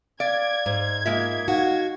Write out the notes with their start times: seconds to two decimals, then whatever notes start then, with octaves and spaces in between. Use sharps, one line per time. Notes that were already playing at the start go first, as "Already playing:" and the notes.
0.20 D5 F5 G#6
0.66 G#2
1.06 G#3 A#3 F4 E5
1.48 D#4 F#4 F5 F#5